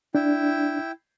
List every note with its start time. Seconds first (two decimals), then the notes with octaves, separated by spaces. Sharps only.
0.15 D4 E4 G5